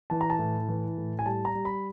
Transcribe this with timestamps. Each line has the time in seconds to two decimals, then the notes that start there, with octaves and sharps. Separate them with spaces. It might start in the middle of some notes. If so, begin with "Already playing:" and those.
0.10 E3 A5
0.21 A#5
0.30 A5
0.39 A2
0.69 E3
0.98 A2
1.19 G#5
1.26 G3 A5
1.45 A#5
1.55 G3
1.65 B5